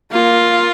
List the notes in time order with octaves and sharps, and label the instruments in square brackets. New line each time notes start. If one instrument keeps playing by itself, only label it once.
[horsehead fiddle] A#3 [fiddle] F4